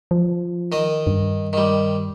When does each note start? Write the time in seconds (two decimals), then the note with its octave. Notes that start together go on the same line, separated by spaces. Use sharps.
0.11 F3
0.72 D#3 D#5
1.07 G2
1.53 D#3 G3